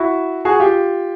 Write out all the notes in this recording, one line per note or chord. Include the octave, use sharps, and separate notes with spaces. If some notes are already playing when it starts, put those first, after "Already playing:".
Already playing: E4 F#4
F#4 G#4
F4 G4